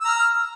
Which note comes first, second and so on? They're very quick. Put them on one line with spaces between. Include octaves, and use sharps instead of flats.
E6 A#5 F6